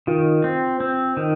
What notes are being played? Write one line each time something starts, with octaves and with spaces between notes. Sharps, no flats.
D#3 F4
C4
C4
D#3